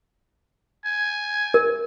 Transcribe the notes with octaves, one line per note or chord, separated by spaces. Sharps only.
G#5
A#4